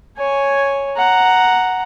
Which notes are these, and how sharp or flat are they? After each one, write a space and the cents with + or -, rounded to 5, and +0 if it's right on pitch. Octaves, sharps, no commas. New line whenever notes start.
C#5 +0 G#5 +0
F#5 +0 A#5 +0